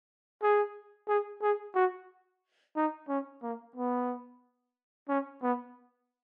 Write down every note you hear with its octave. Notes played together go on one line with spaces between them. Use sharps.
G#4
G#4
G#4
F#4
D#4
C#4
A#3
B3
C#4
B3